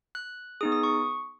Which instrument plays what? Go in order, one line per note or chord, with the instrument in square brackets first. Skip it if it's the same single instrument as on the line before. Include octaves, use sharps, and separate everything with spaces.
[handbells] F#6
B3 D#4 G#4 D#6
D#6
C#6